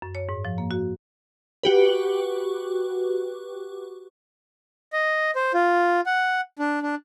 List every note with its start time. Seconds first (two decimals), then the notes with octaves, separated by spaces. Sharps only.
0.02 F#2
0.15 C#5
0.29 G#2
0.45 F3
0.58 A#3
0.71 F#4
1.63 F#4 G4 B4
4.93 D#5
5.36 C5
5.54 F4
6.06 F#5
6.59 D4
6.82 D4